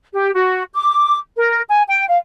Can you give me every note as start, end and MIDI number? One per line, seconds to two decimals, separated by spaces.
0.14 0.30 67
0.33 0.64 66
0.74 1.18 86
1.35 1.61 70
1.68 1.81 80
1.87 2.06 79
2.07 2.18 77